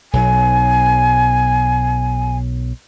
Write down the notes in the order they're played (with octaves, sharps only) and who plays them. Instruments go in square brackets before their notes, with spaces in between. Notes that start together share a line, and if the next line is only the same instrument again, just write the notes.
[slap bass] B1 F#3 [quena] G#5